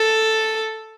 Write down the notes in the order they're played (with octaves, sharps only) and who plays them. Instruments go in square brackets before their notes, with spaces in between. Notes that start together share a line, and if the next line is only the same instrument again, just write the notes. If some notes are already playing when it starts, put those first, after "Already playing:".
Already playing: [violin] A4